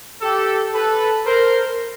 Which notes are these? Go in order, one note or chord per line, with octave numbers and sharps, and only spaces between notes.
G4 A4
A4 B4
A#4 C5